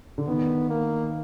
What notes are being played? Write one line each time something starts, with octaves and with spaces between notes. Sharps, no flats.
D3
D#3 B3
A#3